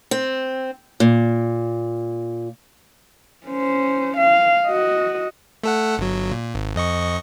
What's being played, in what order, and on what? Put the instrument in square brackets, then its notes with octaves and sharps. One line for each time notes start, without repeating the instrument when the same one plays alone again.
[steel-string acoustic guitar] C4
A#2
[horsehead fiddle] C#4 C5
F5
F#4 D#5
[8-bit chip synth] A3 A4 F#5
G1 F#3
A#2
G#1
F2 D#5 C#6